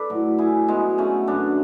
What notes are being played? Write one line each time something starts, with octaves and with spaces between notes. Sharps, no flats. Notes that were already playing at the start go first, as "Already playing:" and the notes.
Already playing: A4 B4 D5
A2 F#3
E4 G#4
B2 F#3 G#3 B3
A3 C#4
F#2 D3 F#3 B3 D4